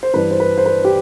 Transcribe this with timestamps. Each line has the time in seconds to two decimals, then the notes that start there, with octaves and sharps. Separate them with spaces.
0.03 C5
0.14 G2 E3 B4
0.31 C5
0.40 B4
0.58 C5
0.66 B4
0.85 G4